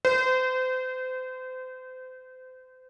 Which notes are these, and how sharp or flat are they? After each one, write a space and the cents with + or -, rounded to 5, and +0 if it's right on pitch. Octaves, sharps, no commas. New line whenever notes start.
C5 -30